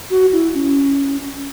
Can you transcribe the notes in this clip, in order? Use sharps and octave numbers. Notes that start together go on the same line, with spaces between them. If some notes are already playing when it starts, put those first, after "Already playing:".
F#4
E4
C#4